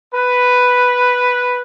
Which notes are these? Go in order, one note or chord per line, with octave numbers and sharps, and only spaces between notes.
B4